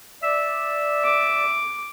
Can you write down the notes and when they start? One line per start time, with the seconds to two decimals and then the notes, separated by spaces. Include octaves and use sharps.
0.23 D5 E5
1.04 D6